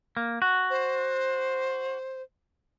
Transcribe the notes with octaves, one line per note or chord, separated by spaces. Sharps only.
A#3
F#4
C5